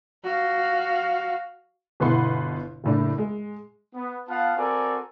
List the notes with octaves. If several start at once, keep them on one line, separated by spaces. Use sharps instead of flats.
F#4 F5
G1 B2 E4 B4 F#5 C6
F#1 A2 D4
G#3
B3
B3 F4 F5 F#5 A5
C4 F#4 A4 A#4 D5 G#5